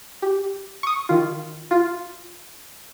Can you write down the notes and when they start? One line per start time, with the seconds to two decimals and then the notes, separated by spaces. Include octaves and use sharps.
0.22 G4
0.83 C#6 D#6
1.09 D#3 F4
1.71 F4